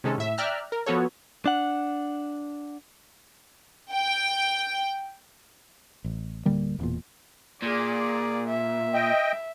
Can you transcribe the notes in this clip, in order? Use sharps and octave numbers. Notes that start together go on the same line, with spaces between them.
C3 D#3 G#3 C#4 A4
A2 E5
D5 E5 G5 A#5 F6 F#6
A#4
F3 B3 F#4 A4 C#5
D4 F#5
G5
A1
D1 D3 G3 A#3
E1 E2 A#2
A#2 G#4 D5
E5
D#5 G5